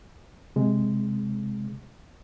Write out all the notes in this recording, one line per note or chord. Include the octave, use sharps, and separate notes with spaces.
C3 G#3